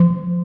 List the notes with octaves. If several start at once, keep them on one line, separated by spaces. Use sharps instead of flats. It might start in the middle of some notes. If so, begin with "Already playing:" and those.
Already playing: F3